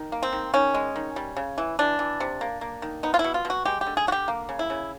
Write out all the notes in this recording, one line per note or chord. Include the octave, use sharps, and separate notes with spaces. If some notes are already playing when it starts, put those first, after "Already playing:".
Already playing: D#3
A#3
C4
D#3
D#3 C#4
G#3
D#3
G3
C#3
E3
E3 D4
E3
C3
A#3
A#3
D#3
B3 D#4
F4
E4
B2
F4
B2
F#4
G#3 G4
G4
D3
G#4
D3 F#4
G4
A#3
C#3
E4
C#3